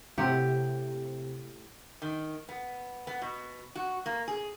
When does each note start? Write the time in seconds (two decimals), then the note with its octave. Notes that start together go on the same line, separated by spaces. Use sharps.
0.18 A2 C3 G4 F#5
2.02 D#3
2.49 B3
3.07 B3
3.22 B2
3.75 F#4
4.06 A#3
4.28 G#4